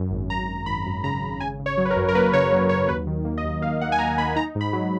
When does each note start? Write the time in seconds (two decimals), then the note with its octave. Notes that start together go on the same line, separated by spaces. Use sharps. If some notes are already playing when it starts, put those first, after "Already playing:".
Already playing: F#2
0.11 G#1
0.30 F#2 A#5
0.48 F#2
0.66 G#1 B5
0.86 F#2
1.04 C#3 A#5
1.22 G#1
1.40 C#3 G#5
1.60 C#3
1.66 C#5
1.78 F#3
1.85 B4
1.91 A#4
1.97 F#2
2.08 A#4
2.15 A#3 B4
2.33 C#3 C#5
2.51 F#3 C#5
2.69 F#3 C#5
2.88 D#2 B4
3.07 D#3
3.25 A#3
3.38 D#5
3.44 D#2
3.62 A#3 F5
3.81 A#3 F#5
3.92 G#5
3.99 A#3 A#5
4.18 A#3 B5
4.36 D#4 A#5
4.55 G#2
4.61 B5
4.73 F#3